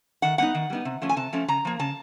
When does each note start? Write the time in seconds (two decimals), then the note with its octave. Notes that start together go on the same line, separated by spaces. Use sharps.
0.22 D#3 F#5
0.38 G3 B3 D#4 F#5
0.55 D#3
0.70 G3 B3 D#4
0.85 C3
1.02 F3 A3 C#4
1.09 G#5
1.17 C3 A5
1.33 F3 A3 C#4
1.48 C#3 A#5
1.65 F3 A#3
1.79 C#3 A5